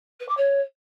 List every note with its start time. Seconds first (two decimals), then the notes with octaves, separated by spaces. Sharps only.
0.20 B4
0.28 D6
0.37 C#5